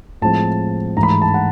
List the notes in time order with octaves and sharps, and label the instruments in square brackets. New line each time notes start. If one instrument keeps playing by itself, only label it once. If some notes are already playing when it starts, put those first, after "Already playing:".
[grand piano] A2 F3 G#3 C4 A5
G#2 E3 A3 A#5
B5
A#5
A5
F#5